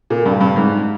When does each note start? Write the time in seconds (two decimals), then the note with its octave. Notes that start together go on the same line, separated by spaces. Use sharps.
0.10 A#2
0.25 G2
0.41 G2
0.56 G#2